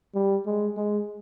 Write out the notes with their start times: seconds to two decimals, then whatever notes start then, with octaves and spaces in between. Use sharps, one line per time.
0.15 G3
0.46 G#3
0.77 G#3